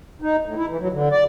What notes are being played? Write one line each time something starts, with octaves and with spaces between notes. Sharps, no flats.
D#4
A2
E4
E3
F#3
D3
D5